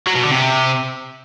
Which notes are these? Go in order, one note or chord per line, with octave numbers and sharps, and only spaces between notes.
F#3
B2
D3
C3